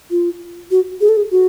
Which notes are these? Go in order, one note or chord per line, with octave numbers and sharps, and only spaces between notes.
F4
F#4
G#4
A4
G#4
F#4